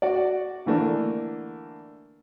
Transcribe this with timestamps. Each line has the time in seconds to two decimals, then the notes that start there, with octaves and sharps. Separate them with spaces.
0.02 F#4 D5
0.66 D3 E3 A3 A#3 D4